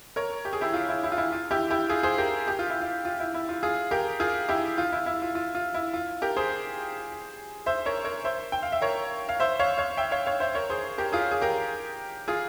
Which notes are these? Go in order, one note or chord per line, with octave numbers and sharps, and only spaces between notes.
A#4 C#5
G4
G#4
E4 G4
F4
E4
E4
F4
E4
F4
E4 G4
E4 G4
F4 G#4
G#4 C5
G4 A#4
G4
F4
E4
F4
F4
E4
E4
F4
F4 G#4
G4 A#4
F4 G#4
E4 G4
F4
E4
E4
F4
F4
F4
E4
F4
G4 A#4
G#4 C5
C5 E5
A#4 C#5
A#4 C#5
C5 E5
G5
F5
E5
A#4 C#5
F5
C5 E5
C#5 F5
C#5 F5
E5 G5
C#5 F5
C#5 F5
C5 E5
A#4 C#5
G#4 C5
G4 A#4
F4 G#4
G#4
G4 A#4
F4 G#4